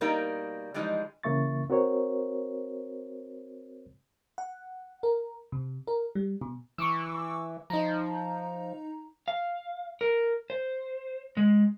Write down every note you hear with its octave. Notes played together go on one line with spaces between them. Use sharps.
B2 G3 A#3 D#4 A#4
E3 F3 G3 G#3 D#4
C#3 E3 A#3 E5 C#6 A6
C4 F#4 A#4 C5 C#5
F#5
A#4
C3
A#4
G3
B2
E3 C#6 D6 E6
F3 D#4 A#5
F5
A#4
C5
G#3